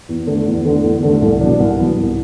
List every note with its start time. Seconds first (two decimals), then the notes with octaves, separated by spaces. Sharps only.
0.09 E2
0.27 D3 A3
0.46 E2
0.65 D3 A3
0.83 E2
1.03 D3 A3
1.22 C2
1.41 B2 F#3 B3 D4
1.60 C2
1.78 B2 F#3 B3 D4
1.97 C2